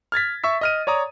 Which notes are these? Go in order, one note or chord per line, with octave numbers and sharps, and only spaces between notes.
F6 G#6 A6 B6
E5 C#6 E6 B6
D#5 F6 D#7
C#5 D5 A#5 D#6